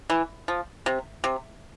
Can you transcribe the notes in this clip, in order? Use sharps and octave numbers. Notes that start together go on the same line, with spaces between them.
E3
F3
C3
C3